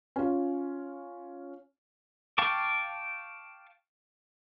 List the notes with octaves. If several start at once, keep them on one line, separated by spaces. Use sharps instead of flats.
C#4 F4
F5 G5 A5 C#6 D6